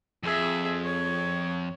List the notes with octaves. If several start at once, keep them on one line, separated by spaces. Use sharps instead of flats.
F2 G#4 E5
C#5